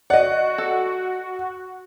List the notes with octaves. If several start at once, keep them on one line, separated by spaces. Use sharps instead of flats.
F#4 D5 D#5 F#5
A4